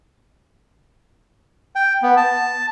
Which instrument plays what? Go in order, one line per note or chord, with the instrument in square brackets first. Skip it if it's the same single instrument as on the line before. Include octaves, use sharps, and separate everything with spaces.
[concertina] G5
B3
A5